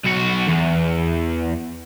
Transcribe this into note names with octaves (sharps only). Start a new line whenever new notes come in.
B1 F#4
E2